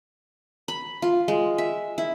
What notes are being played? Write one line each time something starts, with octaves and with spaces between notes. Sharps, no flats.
B5
F4
G#3
E5
E4